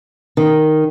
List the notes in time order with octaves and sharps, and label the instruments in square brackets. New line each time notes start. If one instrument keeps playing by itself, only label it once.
[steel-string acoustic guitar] D#3